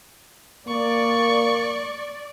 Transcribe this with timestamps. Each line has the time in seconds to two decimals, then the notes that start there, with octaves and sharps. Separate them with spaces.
0.68 A#3 D5 C#6